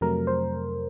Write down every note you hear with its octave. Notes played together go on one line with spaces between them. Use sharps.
F2 C3 F#3 A3 A#4
C5